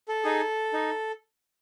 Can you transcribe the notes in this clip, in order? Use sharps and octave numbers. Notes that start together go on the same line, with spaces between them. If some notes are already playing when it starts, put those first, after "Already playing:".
A4
D#4 G#4
D#4